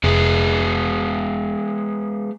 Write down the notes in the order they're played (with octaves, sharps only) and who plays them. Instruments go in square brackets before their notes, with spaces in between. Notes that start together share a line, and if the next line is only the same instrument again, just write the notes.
[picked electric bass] F1 [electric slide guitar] G#3 B3 G#4